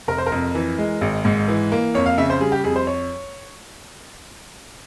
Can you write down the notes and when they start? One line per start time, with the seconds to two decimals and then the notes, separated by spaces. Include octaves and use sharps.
0.08 F1 A#4
0.18 C5
0.27 A#4
0.32 F2
0.55 E3
0.78 G#3
1.01 G#1
1.25 G#2
1.48 E3
1.72 A#3
1.94 F2 C#5
2.06 F5
2.18 C#3 E5
2.30 C5
2.41 G3 G#4
2.52 G4
2.64 F2 G#4
2.76 C5
2.87 C#5